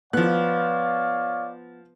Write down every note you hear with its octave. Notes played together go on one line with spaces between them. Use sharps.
F3 B3 C#5 D5 F5 F#6